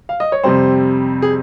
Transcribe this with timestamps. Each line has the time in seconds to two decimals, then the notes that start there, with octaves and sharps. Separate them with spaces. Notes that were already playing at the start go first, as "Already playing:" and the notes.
0.09 F5
0.20 D#5
0.32 C#5
0.44 F2 C3 G3 C4 C5
1.22 G#4